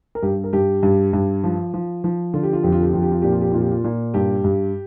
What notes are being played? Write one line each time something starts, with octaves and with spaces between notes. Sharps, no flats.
A#4
G2 G4
A#4
G2 G4
G2
G2
F3
F3
F3
D3 F4
G4
F4
F2 G4
F4
G4
F2 F4
G4
F4
A#2 G4
F4
G4
A#2 F4
G4
F4
A#2
G2 G4
G2